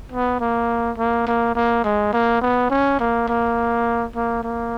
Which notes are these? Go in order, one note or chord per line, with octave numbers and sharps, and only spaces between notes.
B3
A#3
A#3
A#3
A#3
G#3
A#3
B3
C#4
A#3
A#3
A#3
A#3